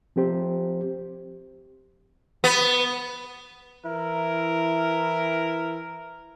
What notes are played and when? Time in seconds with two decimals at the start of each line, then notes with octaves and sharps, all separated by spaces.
0.16 F3 C4 G4 C5
2.44 B3
3.84 E3 E4 A#4